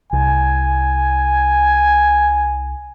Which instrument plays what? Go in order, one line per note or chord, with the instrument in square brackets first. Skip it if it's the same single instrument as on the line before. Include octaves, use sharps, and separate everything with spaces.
[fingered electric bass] C2 [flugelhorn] G#5